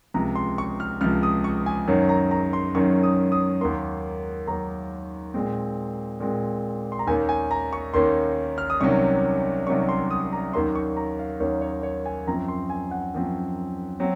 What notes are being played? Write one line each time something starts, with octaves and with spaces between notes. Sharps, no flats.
C#2 C3 F3 A#5
C6
C#6
F6
C#2 C3 F3 F6
D#6
C#6
G#5
F#2 D#3 F#3 C#4
A#5
A#5
C6
F#2 D#3 F#3 C#4 C#6
D#6
D#6
D#2 D#3 F#3 A#3 C6
D#2 D#3 F#3 A#3 A#5
A#2 G#3 C4
A#2 G#3 C4
C6
A#5
D#2 D#3 A#3 C#4 G#5
G#5
A#5
C#6
D#2 D#3 A#3 C#4 C6
F6
D#6
C2 C3 D#3 F#3 C#4 C#6
C2 C3 D#3 F#3 C#4 C#6
C6
D#6
A#5
D#2 D#3 F#3 A#3 C#4 C6
C#6
A#5
F5
D#2 D#3 F#3 A#3 C#4 C#5
C#5
C#5
G#5
F#2 F3 C4 A#5
C6
G#5
F#5
F#2 F3 C4
F#3 C4